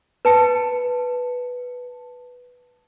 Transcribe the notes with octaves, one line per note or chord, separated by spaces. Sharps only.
B4 A5 C#7